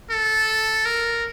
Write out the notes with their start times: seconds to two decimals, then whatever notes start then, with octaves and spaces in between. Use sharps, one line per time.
0.10 A4
0.85 A#4